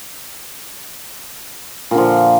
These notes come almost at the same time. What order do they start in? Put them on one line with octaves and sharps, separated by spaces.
A#2 D3 F3